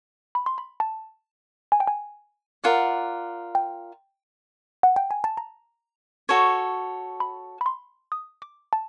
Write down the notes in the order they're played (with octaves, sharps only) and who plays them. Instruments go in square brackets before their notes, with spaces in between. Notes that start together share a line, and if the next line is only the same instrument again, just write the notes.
[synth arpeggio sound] B5
C6
B5
A5
G#5
G5
G#5
[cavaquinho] F4 A#4 D5 F#5
[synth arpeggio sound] G5
F#5
G5
G#5
A5
A#5
[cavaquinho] F#4 A4 C#5
[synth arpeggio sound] B5
B5
C6
D#6
D6
A5